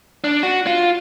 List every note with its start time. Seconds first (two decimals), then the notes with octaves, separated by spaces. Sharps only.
0.24 D4
0.43 F#4
0.67 F4